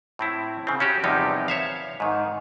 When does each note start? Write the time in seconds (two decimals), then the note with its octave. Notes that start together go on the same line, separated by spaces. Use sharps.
0.19 A2 C4 E4
0.67 C#3 C4
0.80 C#4 F#4 G4
1.04 E2 C3 F3 G3 D#4 G4
1.48 C#5 E5 F5
2.00 G#2 D#3